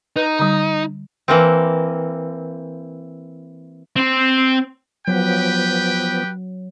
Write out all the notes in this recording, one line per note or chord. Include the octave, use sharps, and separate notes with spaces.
D#4 B4
D3 G3
E3 A#3 C4
C4 C5
F3 F#3 B3 G4 B4 G5